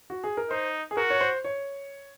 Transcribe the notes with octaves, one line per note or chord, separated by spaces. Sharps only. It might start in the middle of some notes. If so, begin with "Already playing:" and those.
F#4
G#4
A#4
D#4 C5
G#4
F#4 A#4
C#5
C5
C#5